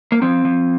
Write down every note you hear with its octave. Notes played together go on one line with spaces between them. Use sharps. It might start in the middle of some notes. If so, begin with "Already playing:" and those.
A#3
F3 C4
F3